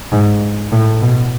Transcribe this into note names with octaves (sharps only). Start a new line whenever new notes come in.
G#2
A2
B2